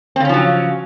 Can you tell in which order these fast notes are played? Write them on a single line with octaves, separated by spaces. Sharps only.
C4 C#3 C#4 F3 F#3